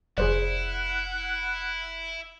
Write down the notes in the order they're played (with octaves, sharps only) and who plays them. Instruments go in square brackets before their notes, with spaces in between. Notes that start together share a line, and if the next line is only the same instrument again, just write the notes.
[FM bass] F1 [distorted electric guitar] E4 [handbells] G#4 C5 D5 [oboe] F#5